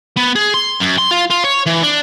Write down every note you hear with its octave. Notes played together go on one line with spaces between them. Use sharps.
B3
G#4
C6
F#2
C6
F4
F4
C#5
E3
D4